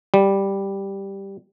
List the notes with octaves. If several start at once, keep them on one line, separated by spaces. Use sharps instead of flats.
G3